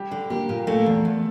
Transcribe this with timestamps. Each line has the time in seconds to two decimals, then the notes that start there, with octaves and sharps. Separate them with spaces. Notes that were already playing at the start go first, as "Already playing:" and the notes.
Already playing: G3 G4
0.11 D3
0.30 A#3 G4 A#4
0.49 A#2
0.67 A3 A#3 A4
0.86 E2
1.05 E2